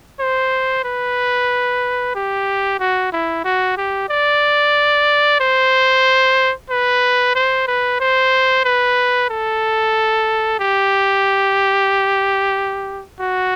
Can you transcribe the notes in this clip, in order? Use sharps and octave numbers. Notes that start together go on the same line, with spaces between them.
C5
B4
G4
F#4
E4
F#4
G4
D5
C5
B4
C5
B4
C5
B4
A4
G4
F#4